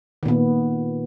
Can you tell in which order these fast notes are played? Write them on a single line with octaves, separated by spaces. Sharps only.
D#3 A#2 B3